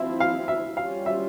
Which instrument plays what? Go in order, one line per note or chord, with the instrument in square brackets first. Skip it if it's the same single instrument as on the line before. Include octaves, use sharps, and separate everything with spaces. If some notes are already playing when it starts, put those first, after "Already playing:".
Already playing: [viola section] F3 C4 E4 [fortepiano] E5
[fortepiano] F5
E5
[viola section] G3 C#4 F4 [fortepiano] F5
[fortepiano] E5